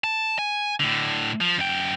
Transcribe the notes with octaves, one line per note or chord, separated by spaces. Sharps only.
A5
G#5
A2 D3
F3
F#2 G5